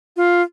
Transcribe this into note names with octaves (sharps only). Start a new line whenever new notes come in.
F4